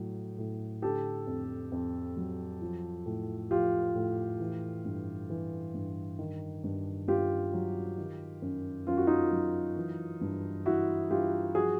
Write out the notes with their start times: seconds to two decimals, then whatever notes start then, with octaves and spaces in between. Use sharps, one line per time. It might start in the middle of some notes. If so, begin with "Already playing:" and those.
Already playing: A2 F#3
0.38 A2
0.82 D3 G4 A4
1.27 F2
1.72 F2
2.17 F#3
2.62 F3
3.06 A2
3.51 F3 F4 G4
3.95 A2
4.40 E3
4.85 G2
5.30 E3
5.74 G2
6.19 D#3
6.64 G2
7.08 G2 F4 G4
7.53 F#3
7.98 D#3
8.42 F#2
8.87 F#2 F4
8.97 F#4
9.07 D#4 F4
9.31 F#3
9.76 E3
10.21 G2
10.66 E3 E4 F#4
11.10 G2 F4 G4
11.55 F3 F#4 G#4